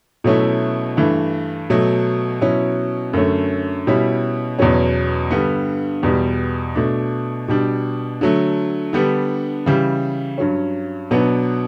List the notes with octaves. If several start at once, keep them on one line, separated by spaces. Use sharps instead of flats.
B2 F#3 A3 C#4 E4
G2 E3 A3
B2 F#3 A3
B2 F#3 C#4 E4
F#2 D3 A3 C#4
B2 G3 C#4 E4
E2 B2 F#3 C#4
G2 D3 G3 B3
E2 B2 G3
B2 A3 D4
B2 G3 D4
D3 F#3 A3
D3 G3 B3 D4
C#3 E3 G3
G2 F#3 C#4
B2 F#3 B3 D4